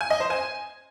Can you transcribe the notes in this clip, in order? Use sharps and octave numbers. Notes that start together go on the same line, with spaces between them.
G#5
D#5
C5
G#5